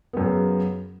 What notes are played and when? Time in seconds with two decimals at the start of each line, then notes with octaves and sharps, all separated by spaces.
0.13 B3
0.17 F#2
0.21 C#3